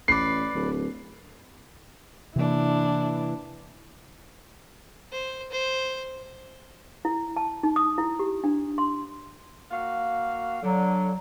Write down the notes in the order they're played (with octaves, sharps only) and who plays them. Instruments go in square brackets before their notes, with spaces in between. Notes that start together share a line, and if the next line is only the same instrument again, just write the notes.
[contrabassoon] A1 [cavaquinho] B4 D5 [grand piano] C7
[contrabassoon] D1
[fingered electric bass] C3 A#3 [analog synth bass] E3 [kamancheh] D4 E4
[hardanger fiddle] C5
C5
[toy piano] E4
A5
D#4
D#6
E4
G4
D4
C6
[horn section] A#3 F#4 F5
[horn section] D3 [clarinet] F#3